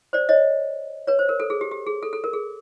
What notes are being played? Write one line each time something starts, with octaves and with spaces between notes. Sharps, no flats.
C5 D5
C#5 D#5
B4 C#5
C5
A#4
A4
G#4
G4
G4
G#4
A4
A4
A#4
G#4